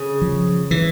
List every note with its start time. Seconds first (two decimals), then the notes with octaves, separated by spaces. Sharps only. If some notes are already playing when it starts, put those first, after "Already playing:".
Already playing: C#3
0.22 F3
0.71 E3